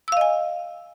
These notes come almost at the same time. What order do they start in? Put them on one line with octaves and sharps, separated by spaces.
E6 F5 D#5 G#5